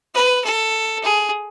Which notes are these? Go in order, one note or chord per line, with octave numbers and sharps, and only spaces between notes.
B4
A4
G#4